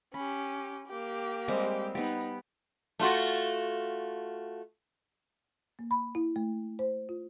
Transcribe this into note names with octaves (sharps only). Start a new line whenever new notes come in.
C#4 G4 B5
A#3 G4
G3 G#3 C4
B3 D#4 G4
A3 F4 F#4
A#3
B5
E4
A3
C5
F4